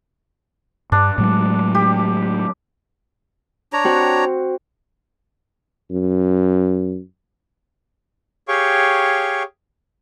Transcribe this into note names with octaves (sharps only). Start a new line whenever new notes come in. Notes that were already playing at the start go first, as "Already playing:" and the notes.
G2 D4
A2 F#3 G#3
G4
D4 C#5 A#5
C4 F#4
F#2
G4 G#4 C#5 F5 G5 C#6